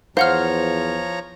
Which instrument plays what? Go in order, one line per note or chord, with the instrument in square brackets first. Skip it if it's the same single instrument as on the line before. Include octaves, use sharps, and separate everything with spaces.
[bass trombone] E2 [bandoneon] F3 C#5 A#5 [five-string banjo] C5 [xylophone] F5 F#5 F6